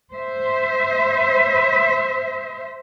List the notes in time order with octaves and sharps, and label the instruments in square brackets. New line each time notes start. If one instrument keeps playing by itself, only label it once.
[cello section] C5 E5